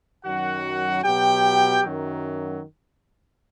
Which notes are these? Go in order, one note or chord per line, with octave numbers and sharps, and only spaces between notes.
F#2 D#3 F#3 F#4 F#5
B2 F#3 G4 G5
F#2 D#3 F#3